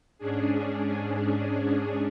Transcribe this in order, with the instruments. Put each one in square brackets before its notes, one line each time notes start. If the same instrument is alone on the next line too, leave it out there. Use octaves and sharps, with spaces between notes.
[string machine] G#2 C#4 D4 G#4